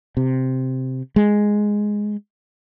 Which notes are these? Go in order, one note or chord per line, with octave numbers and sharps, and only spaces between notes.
C3
G#3